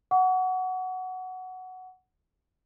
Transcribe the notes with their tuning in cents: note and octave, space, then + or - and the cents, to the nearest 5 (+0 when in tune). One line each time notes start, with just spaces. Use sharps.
F#5 +0 C#6 +40